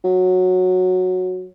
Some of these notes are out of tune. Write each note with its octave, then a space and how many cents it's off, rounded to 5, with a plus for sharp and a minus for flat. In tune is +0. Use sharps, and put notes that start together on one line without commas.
F#3 -10